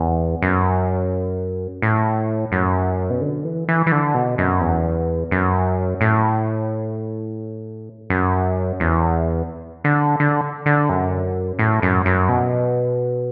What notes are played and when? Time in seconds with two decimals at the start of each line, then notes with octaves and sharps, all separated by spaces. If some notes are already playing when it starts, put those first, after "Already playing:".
Already playing: E2
0.42 F#2
1.82 A2
2.52 F#2
3.10 B2
3.21 D3
3.45 E3
3.68 E3
3.87 E3
3.92 D3
4.15 B2
4.38 F#2
4.61 E2
5.31 F#2
6.01 A2
8.10 F#2
8.80 E2
9.84 D3
10.20 D3
10.66 D3
10.90 F#2
11.59 A2
11.82 F#2
12.06 F#2
12.29 B2